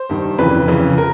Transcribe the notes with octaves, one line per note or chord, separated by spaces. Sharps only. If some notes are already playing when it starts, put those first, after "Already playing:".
Already playing: C5
G2 D#3
F2 C#3 E3 B4
F2 C#3 E3
A#4